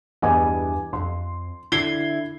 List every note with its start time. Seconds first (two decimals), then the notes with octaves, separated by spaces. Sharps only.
0.22 E2 G2 B3 D#5 G#5 D6
0.93 F2 C6
1.72 D3 E4 G#6 C7 G7